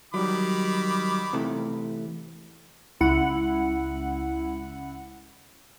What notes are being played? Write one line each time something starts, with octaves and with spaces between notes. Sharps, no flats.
D#3 F#3 G3 B5 D6
C3 E3 A3
C#2 E4 F#5